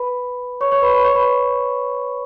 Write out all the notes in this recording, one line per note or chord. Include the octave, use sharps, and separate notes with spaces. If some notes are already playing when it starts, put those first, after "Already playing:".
Already playing: B4 B5
C#5 C#6
C#5 C#6
B4 B5
B4 B5
C#5 C#6
B4 B5